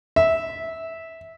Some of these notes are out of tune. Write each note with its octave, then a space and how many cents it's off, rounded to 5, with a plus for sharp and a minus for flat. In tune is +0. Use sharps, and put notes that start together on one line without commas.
E5 -15